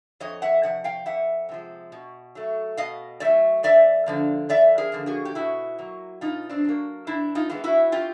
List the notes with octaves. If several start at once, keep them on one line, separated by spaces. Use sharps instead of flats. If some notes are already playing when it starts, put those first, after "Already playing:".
F2 C#5 D#5
E5 F#5
C3 F3 F#5
F5 G5
F2 E5 F#5
C3 F3 G#3
B2
F#3 A3
B2 D#5 F5
F#3 A3 D5 E5
F2 D5 E5
D3 F3 A#3
F2 D5 E5
G#4 A#4
D3 F3 A#3
F#4 G#4
G4
B2 E4 F#4
F#3 A#3
B2 D#4 F4
C4 D4
F#3 A#3
G2 D4 E4
D#4 F4
E3 G#3 B3
E4 F#4
F4 G4